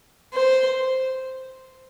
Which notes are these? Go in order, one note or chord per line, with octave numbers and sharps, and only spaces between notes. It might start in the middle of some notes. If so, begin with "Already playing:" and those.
C5